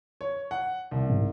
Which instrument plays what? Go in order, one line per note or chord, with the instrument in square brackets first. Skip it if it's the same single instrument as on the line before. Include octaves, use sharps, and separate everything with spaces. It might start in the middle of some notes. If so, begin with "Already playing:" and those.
[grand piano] C#5
F#5
C2
[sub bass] G#2